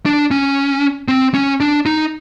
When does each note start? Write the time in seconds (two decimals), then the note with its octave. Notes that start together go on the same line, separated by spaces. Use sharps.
0.06 D4
0.31 C#4
1.08 C4
1.34 C#4
1.60 D4
1.86 D#4